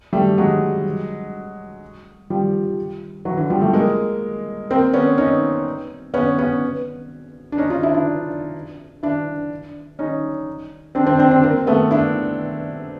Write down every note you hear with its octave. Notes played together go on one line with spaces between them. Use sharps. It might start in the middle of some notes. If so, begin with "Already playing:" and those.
G3 A3
F#3 G#3
F3 G3
E3 F#3
D3 E3
F3 G3
G3 A3
G#3 A#3
A#3 C4
B3 C#4
C#4 D#4
B3 C#4
B3 C#4
D4
C#4 D#4
D#4 F4
D4 E4
D4 E4
D4 E4
C#4 D#4
C4 D4
C4 D4
C4 D4
C4 D4
A#3 C4
A3 B3
D4 E4